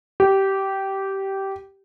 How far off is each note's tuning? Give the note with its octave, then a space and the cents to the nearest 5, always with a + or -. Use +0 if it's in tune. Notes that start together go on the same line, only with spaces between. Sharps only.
G4 -15